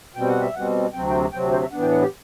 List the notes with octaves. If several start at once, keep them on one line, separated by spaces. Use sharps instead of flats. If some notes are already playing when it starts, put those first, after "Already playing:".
B2 G3 C4 G5
F#5
E5
B2 G3 C4 F#5
D2 C3 F#3 C4 G5
G5
D2 C3 F#3 C4 G5
C5
E5
A2 E3 B3 D4 F#5
G5
F#5
G4